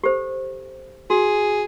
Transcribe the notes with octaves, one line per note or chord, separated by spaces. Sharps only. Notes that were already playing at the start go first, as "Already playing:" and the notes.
G4 A4 C5
F#4 G#4